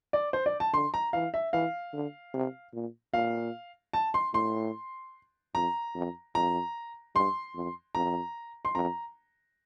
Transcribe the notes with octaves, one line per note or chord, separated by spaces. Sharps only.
D5
C5
D5
A5
D3 C6
A#5
E3 F5
E5
E3 F5
D3
C3
A#2
A#2 F5
A5
C6
A2 C6
F2 A#5
F2
F2 A#5
G2 C6
F2
F2 A#5
C6
F2 A#5